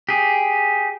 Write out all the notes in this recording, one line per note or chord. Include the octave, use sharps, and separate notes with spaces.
G4 G#4